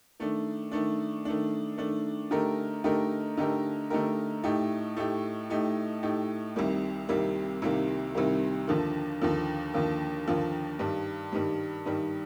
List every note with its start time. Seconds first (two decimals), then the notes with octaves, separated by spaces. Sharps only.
0.19 D#3 A3 D4
0.71 D#3 A3 D4
1.25 D#3 A3 D4
1.77 D#3 A3 D4
2.31 D3 A3 D#4 G4 A#4
2.84 D3 A3 D#4 G4 A#4
3.37 D3 A3 D#4 G4 A#4
3.90 D3 A3 D#4 G4 A#4
4.43 A2 A3 D#4 G4
4.96 A2 A3 D#4 G4
5.49 A2 A3 D#4 G4
6.02 A2 A3 D#4 G4
6.56 C2 C3 D#3 G3 A#3
7.08 C2 C3 D#3 G3 A#3
7.62 C2 C3 D#3 G3 A#3
8.15 C2 C3 D#3 G3 A#3
8.67 D#2 D3 F3 A#3
9.21 D#2 D3 F3 A#3
9.74 D#2 D3 F3 A#3
10.27 D#2 D3 F3 A#3
10.79 G2 D#3 G3
11.32 G2 D#3 G3
11.86 G2 D#3 G3